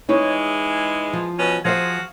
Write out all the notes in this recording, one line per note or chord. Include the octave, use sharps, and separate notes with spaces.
E3 G#3 D#4 E4 C#5
F3
B2 C#4
F3 F#4 G#4 C5 E5 F5